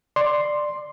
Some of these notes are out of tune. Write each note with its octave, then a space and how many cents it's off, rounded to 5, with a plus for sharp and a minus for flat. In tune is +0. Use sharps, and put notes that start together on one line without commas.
D5 +15 C6 +0